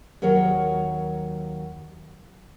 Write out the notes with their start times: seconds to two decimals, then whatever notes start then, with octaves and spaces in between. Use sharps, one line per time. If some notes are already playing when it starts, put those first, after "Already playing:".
0.22 D#2 F#3 A#4 C#5